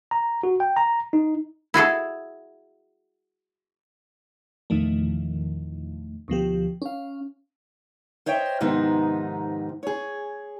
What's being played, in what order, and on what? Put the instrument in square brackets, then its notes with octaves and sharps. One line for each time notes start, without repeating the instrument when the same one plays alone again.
[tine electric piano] A#5
F#4
G5
A#5
D#4
[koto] E4 F#4 G#4 A4
[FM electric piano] E2 A#2 D#3 F3 A3
D2 B2 F3 G4
C#4 F5
[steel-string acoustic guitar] C5 C#5 D#5 E5 G5
G#2 C3 D#3 F3 B3 D#4
G#4 C#5